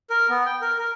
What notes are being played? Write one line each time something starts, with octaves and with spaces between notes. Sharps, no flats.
A#4
B3
G5
A#4
A#4